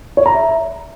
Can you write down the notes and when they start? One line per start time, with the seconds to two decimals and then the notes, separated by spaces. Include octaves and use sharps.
0.17 C#5
0.26 A#5
0.34 E5